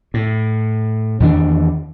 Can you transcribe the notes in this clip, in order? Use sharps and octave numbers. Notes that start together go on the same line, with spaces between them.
A2
E2 D#3 E3 D4